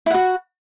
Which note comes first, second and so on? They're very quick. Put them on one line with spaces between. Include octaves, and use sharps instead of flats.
E4 F#5 F#4